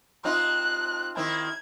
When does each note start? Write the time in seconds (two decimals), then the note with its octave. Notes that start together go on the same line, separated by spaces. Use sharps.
0.25 C4 D#4 F4 F#6
1.17 D#3 C4 E4 G#6